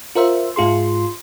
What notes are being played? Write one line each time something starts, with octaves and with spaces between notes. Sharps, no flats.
F4 A#4 C5 E5
G#2 F4 G#4 C6